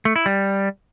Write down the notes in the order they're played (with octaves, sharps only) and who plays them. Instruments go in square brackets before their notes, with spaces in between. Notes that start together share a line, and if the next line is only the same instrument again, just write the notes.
[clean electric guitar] A3
E4
G3